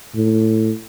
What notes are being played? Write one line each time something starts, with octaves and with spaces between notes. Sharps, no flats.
A2